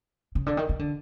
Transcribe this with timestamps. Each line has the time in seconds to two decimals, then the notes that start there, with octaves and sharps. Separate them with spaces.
0.35 C#3
0.46 D3
0.57 D#3
0.69 D#3
0.79 D3